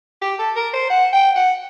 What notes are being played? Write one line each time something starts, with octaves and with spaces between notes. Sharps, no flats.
G4
A4
A#4
C5
F#5
G5
F#5